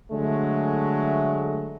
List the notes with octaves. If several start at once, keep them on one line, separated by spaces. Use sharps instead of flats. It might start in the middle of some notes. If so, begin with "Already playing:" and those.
D3 F#3 G#3 A3